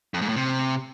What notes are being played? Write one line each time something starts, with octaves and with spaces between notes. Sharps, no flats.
F2
G#2
A2
C3